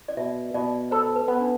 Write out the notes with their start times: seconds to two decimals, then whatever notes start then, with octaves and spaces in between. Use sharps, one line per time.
0.08 D5
0.17 B2 E5
0.54 B2 D5
0.91 A4 C5
1.16 B4
1.28 B3
1.40 D4